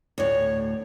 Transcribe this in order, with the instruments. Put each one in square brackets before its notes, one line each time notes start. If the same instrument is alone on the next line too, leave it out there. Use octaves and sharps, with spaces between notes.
[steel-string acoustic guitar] D2 A2 [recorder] C#5